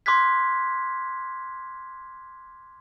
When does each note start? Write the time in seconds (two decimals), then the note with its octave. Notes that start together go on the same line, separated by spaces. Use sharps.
0.06 C6 D6 F6 F#6 G#6 B6